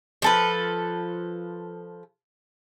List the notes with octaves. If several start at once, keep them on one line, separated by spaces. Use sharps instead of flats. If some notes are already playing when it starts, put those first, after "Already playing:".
F3 A4 B4